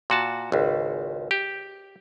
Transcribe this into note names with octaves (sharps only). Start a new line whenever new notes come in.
A#2 F#4 A5
G#1 C#2
G4